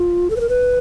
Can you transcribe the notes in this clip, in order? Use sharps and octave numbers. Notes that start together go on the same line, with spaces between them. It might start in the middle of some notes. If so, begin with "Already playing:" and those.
Already playing: F4
A4
B4
A#4
B4